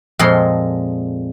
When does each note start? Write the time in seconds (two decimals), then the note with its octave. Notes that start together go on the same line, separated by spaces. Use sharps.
0.19 F2 A#2 G#3 A4 D#5 C6